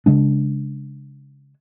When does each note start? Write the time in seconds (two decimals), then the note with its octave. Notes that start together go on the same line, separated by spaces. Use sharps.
0.06 C#3 G#3 D4